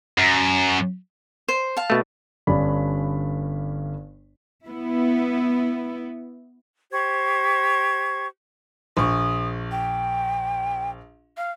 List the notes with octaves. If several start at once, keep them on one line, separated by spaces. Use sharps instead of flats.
F#2
C5
F5 A5
B2 A3
G1 G2 C#4 D5 B5
B3 E4
G4 C5 C#6 G#6
A#1 C#6 D#6
G5
F5